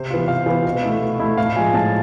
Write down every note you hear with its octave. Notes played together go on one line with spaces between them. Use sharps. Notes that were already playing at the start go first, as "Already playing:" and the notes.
Already playing: C3 C5
E3 B3 F4
C3 F5
E3 B3 F4
B2
A3 E4
B2
A3 E4
A2 F5
F3 G#3 G#5
A2 A5